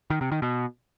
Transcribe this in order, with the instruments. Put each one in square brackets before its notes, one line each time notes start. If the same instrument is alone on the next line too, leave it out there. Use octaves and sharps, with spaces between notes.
[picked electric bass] D#3
C3
D#3
B2